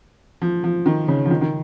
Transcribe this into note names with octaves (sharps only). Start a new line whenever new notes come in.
F3
F3
D#3
C#3
F3
D#3
D#3